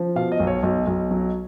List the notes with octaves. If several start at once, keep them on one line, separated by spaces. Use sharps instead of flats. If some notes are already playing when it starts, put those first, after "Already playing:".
Already playing: F3
B2 F5
D#5
B1
C#5
B1 D#5
B1
F#3